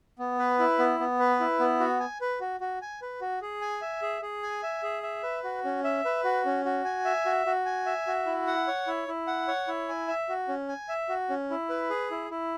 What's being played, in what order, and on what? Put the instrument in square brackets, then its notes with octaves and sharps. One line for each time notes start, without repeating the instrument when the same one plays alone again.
[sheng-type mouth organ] B3
B4
E4
B3
B3
B4
E4
B3
F#4
G#5
B4
F#4
F#4
G#5
B4
F#4
G#4
G#5
E5
G#4
G#4
G#5
E5
G#4
E5
B4
F#4
C#4
E5
B4
F#4
C#4
F#4
G#5
E5
F#4
F#4
G#5
E5
F#4
E4
F#5
C#5
E4
E4
F#5
C#5
E4
G#5
E5
F#4
C#4
G#5
E5
F#4
C#4
E4
B4
G#4
E4
E4